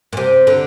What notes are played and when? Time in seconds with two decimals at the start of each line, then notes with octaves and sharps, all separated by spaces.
0.13 A#2
0.17 C3
0.47 D3